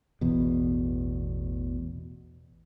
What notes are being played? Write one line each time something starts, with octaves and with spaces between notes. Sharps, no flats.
A1 E2 B2